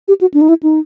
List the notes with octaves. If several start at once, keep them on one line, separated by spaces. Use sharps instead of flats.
G4
F#4
D4
D#4
E4
D#4